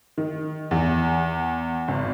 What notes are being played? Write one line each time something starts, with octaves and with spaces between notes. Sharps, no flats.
D#3
E2
G#1